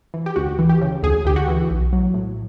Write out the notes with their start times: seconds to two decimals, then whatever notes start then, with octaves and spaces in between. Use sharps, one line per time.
0.14 E3
0.26 G4
0.36 D2 F#4
0.59 E3
0.69 G4
0.81 C#3
1.03 D2 G#4
1.25 D2 G4
1.36 F#4
1.48 E3
1.70 B1
1.93 F#3
2.14 A2